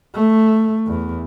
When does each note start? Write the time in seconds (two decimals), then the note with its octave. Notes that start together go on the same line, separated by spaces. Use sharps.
0.15 A3
0.87 E2